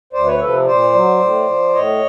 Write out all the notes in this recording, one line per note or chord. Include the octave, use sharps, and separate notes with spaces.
D2 C5 D5
B4 C#5
C3 F3 A4 B4
A#2 C5 D5
F#3
A2
F3
A2 C#5 D#5